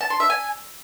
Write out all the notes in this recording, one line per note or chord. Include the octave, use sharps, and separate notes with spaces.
A5
C6
E5
G#5